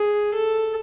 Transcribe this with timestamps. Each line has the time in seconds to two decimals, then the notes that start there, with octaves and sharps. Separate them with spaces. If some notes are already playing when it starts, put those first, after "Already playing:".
Already playing: G#4
0.35 A4